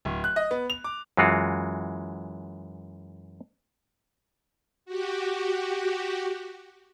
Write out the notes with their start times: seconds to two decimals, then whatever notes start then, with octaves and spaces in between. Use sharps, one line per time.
0.05 D1
0.24 F#6
0.36 D#5
0.51 B3
0.70 F7
0.84 D6
1.17 F#2 E3 G#3 F4 F#4
4.85 F#4 G4